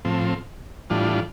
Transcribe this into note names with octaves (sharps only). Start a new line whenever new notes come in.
A2 F3 C4
A2 E3 G3 D4 F4